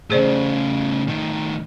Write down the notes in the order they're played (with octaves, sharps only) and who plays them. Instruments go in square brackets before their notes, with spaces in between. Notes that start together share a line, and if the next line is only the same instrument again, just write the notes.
[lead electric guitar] A2 C#3 [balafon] G#4 C5 D5
[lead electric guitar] A2 D#3